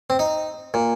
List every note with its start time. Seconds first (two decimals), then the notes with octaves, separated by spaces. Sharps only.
0.10 C4
0.19 D#4
0.74 A#2